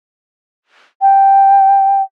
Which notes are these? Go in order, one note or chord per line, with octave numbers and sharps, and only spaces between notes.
G5